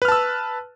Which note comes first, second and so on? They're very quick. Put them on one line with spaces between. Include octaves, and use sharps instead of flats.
B4 F6 A5 E6